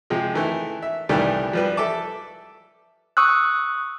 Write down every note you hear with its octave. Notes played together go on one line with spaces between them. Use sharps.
C3 F3 G#3
D#3 E3 A3
E5
C2 D#3 E3 G3 A3
F3 G3 B4
A4 E5 A5 D6
C#6 D#6 E6 F#6